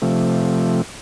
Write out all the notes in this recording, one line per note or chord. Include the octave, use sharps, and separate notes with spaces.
C3 F3 A3